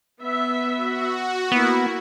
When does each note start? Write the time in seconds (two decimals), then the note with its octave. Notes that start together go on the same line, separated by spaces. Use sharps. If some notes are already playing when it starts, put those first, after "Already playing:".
0.21 B3 E5
0.76 F#4
1.52 A#3 B3 E4